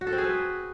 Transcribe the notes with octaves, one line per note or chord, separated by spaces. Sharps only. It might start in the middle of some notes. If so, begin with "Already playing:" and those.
F#4
A4
C4
G#4
B4